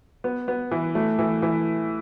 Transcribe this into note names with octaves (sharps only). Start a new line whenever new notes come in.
B3
B3
E3
A3
E3
E3